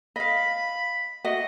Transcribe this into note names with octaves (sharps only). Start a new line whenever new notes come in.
D#5 F5 B5
F#4 D#5 E5 F#5